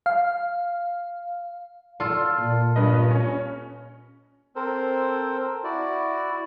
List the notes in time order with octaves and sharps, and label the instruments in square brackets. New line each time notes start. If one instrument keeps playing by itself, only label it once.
[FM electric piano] F5
[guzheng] F4 A4 [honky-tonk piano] D5 C6
[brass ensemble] A#2
[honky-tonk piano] G2 B4 D#5
C#4
[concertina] C4 A4 A#4 C5
E4 F#4 D5